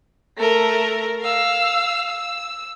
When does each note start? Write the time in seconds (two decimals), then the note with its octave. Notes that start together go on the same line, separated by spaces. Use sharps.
0.37 A3 A#4
1.21 F5 E6
2.09 E6